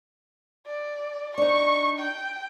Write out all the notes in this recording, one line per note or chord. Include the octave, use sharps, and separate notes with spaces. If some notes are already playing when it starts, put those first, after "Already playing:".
D5
D4 D#4 C#6
G5